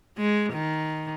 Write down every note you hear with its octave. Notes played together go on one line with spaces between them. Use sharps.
G#3
D#3